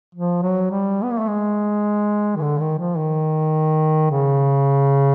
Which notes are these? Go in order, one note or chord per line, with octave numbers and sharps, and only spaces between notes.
F3
F#3
G3
B3
A#3
A3
G#3
D#3
D3
D#3
F3
D#3
C#3